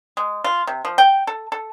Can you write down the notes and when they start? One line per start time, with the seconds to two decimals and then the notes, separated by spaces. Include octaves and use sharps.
0.17 G#3
0.44 F4
0.67 C3
0.85 F3
0.98 G5
1.27 A4
1.52 A4